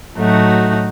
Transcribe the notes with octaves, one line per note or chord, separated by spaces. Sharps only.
A2 F#3 A3 D#4 F#4